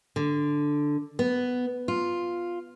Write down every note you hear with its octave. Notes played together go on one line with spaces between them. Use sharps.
D3
B3
F4